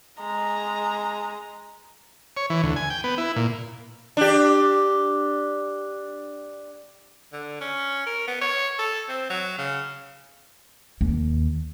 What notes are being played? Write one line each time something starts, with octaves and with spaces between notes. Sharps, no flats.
G#3 A#5
C#5
E3
D2
G#5
G5
B3
E4
A#2
D4 G4
D3
C#4
A#4
B3
C#5
A4
C4
F#3
C#3
D#2